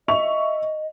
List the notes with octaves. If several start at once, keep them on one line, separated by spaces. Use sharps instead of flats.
D#5 E5 C#6 F7